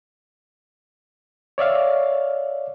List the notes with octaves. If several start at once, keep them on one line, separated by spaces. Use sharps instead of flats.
C#5 D5 E5 F5